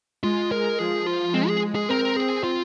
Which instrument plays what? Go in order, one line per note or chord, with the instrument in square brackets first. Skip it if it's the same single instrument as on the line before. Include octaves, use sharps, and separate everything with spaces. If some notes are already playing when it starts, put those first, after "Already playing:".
[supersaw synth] G#3 [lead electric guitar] F4
[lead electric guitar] A#4
[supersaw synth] F3 [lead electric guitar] G#4
[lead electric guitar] F4
[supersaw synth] G#3 [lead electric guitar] C4
[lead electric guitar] G#4
G#4
[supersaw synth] C4 [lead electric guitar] A#4
[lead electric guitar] G#4
F4